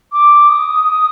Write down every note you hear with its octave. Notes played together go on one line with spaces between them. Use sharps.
D6
D#6